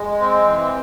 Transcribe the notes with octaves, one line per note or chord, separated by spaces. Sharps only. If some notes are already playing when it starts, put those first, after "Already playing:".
Already playing: G#3
C4
E3